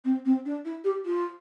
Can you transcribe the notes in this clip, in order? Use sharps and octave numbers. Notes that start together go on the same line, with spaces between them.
C4
C4
D4
E4
G4
F4